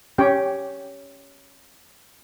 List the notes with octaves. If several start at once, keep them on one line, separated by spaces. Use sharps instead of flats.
C#4 G4 C#5 G5